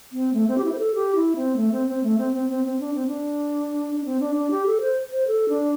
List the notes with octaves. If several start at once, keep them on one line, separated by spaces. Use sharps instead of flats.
C4
A3
C4
G4
E4
C5
A4
G4
E4
C4
A3
C4
C4
A3
C4
C4
C4
C4
D4
C4
D4
D4
C4
D4
D4
G4
A4
C5
C5
A4
D4